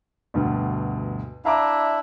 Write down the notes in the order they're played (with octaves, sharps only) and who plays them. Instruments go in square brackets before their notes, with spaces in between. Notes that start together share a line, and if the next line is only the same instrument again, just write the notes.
[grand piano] D2 G2 B2
[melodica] D4 E4 E5 [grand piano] F5 A#5 D6